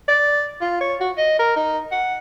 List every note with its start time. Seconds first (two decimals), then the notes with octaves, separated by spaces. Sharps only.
0.08 D5
0.61 F4
0.81 C#5
1.00 F#4
1.17 D#5
1.39 A#4
1.56 D#4
1.92 F#5